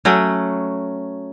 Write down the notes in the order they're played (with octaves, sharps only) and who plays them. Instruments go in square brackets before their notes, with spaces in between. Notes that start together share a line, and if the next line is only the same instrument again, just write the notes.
[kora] F#3 A3 C#4